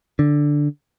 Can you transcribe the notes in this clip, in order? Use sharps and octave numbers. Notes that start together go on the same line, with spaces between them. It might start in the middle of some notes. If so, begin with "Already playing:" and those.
D3